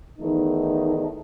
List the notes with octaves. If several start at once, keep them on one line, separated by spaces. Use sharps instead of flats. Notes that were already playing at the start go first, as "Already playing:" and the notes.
E2 D#3 A3 D#4